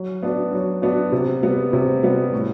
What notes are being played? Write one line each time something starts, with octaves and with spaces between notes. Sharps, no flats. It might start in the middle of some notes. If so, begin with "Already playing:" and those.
Already playing: F#3
B3 D4 F#4
F#3
B3 D4 F#4
C3
G3 B3
C3
G3 B3
A2